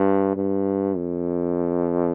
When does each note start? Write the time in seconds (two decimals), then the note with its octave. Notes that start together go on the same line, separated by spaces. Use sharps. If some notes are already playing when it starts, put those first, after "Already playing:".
Already playing: G2
0.36 G2
0.97 F2